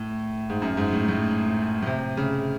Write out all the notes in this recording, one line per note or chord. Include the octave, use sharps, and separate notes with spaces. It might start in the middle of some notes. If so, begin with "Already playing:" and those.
Already playing: A2
G#2
F#2
G#2
A2
A2
A2
C3
C#3